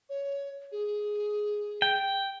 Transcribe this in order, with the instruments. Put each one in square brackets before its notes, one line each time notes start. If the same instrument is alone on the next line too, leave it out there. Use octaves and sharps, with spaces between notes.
[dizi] C#5
G#4
[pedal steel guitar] G5